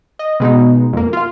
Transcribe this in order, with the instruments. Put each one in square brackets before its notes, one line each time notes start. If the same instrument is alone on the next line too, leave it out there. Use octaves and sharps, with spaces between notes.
[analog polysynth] D#5
B2 G#3 B3 D#4
F2 A#3
F4 F5